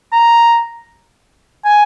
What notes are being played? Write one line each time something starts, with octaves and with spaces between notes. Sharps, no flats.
A#5
G#5